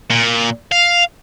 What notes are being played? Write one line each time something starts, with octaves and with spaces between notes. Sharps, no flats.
A#2
F5